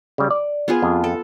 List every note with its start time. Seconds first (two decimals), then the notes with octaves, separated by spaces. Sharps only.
0.18 C#3 G3
0.31 D5
0.68 B3 F4 G#4
0.82 F2
1.04 A4